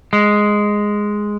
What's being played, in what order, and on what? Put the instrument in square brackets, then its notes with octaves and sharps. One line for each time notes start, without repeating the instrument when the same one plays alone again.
[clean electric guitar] G#3